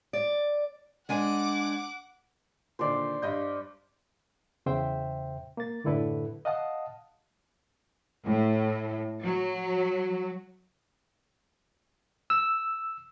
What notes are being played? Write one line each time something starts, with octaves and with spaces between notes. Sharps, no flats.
D5
G#3 D4 F#5 G#5 D6
A#2 D3 D#3 C5 D5
G2 D#5 G6
E2 C#3 C5 E5 G5
A#3 A6
F#2 A2 D3 E4 A4 B4
D#5 F5 F#5 A5 D#6
A2
F#3
E6